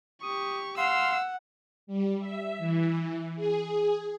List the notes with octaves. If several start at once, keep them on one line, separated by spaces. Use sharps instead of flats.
G4 C#6 D#6
F5 F#5 C6 E6
G3
E5
E3
G#4